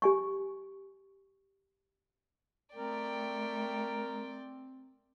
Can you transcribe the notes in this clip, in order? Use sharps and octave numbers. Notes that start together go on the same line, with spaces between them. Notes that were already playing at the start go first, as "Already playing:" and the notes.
G4 G#5 C#6
A3 C4 A#4 D5 G5